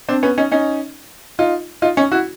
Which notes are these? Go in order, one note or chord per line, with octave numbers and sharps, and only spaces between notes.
C4 D4
B3 C#4
C#4 D#4
C#4 D#4
D#4 F4
D#4 F4
C#4 D#4
E4 F#4